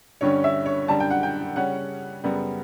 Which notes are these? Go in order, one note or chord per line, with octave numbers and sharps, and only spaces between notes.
G2 D3 G3 C#4 C#5
E5
C#5
F#2 D3 G3 D4 A5
G5
F#5
G5
C#3 G3 C#4 F#5
F#2 C#3 G3 B3